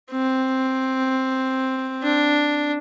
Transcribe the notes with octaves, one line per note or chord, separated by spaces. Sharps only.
C4
D4